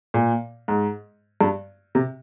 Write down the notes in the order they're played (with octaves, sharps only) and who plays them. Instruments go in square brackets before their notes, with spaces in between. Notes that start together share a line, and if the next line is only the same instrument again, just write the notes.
[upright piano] A#2
G#2
G2
C3